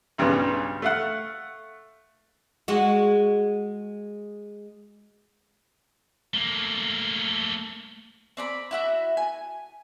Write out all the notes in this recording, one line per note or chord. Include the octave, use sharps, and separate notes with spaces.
B1 G2 C#3 B3
A3 F5 F#5
G#3 F#4
A3 A#3
C4 D5 B5
E4 F#4 E5
G#5